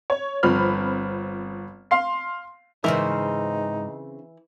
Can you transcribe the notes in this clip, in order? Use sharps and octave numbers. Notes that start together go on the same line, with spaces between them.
C#5
G1 F3 C4 B5 F6
F5 C6 C7
G#2 C#3 E3 C4 D#4 A#4